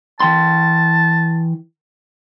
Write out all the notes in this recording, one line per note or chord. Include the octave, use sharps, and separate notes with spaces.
E3 G5 A5 C6